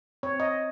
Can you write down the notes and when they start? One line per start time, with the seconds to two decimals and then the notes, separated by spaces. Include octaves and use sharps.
0.23 C4 C#5
0.40 D#5